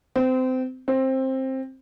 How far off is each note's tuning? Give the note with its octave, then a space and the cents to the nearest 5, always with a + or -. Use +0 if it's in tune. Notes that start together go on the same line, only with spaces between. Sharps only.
C4 -25
C4 +15